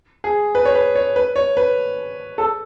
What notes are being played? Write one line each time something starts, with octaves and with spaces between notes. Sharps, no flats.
G#4
B4
C#5
B4
C#5
B4
C#5
B4
A4